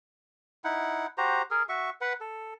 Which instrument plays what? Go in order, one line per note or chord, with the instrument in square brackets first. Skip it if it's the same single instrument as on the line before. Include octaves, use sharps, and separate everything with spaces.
[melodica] D#4 E4 F#5
F#4 G4 C5 A#5
G#4 A#4
F#4 E5 C#6
B4 F#5
A4